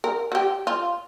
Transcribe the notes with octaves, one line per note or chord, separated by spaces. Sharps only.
A#4
F#4
G4
F4